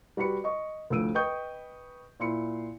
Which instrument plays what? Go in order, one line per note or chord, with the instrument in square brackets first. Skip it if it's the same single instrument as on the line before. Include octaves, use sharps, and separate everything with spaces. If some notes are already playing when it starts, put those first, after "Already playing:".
[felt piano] G3 F#4 B4 B5 C#7
D#5 C#6
D2 A2 F3 E6 D7 D#7
B4 D#5 G5 C#6 D#6 G6
A#2 E4 C6 C#7